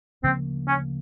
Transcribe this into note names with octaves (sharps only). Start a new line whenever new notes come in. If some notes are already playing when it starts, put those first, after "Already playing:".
D2 C#3 F3 A#3 C4
C#4